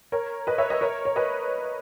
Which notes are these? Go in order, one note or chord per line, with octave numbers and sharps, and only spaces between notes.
A#4 C#5
B4 D#5
C#5 E5
B4 D#5
A#4 C#5
C#5
B4 D#5